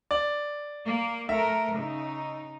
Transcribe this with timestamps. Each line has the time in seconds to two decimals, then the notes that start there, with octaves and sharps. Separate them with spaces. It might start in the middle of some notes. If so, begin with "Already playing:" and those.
0.11 D5
0.86 A#3
1.29 A3 A#4 E5
1.76 C#3 D#4